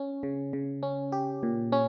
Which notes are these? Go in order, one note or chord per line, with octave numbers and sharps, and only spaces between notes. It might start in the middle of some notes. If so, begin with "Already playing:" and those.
Already playing: C#4
C#3
C#3
C#4
G4
A#2
C#4